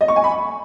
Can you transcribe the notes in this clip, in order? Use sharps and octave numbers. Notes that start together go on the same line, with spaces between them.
D#5
C#6
G#5
B5
C#6